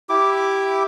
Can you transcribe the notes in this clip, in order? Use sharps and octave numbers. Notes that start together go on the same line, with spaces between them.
E4 G4 D6